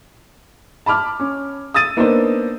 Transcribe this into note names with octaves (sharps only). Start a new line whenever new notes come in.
A5 B5 D6 F6
C#4
D#6 E6 A6 D#7
A#3 B3 D4 D#4 A#4 C5